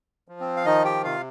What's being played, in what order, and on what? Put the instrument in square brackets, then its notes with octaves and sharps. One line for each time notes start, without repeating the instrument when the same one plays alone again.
[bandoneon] F3
C4
F5
D#3 D#4 D#5
G4 G5
C3 F4 F5